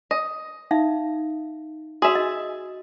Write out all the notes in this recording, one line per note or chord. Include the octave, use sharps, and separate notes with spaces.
D#5
D#4 E5 F5
F#4 G#4 E5
D#5